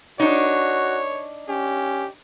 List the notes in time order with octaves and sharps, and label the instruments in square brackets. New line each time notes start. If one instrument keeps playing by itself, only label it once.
[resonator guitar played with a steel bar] D4 D#4 [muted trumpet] F#4 [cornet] C#5
[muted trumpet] C#4 [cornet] G4